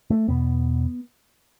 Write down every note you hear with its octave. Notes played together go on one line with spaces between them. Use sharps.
A3
E2 B2 B3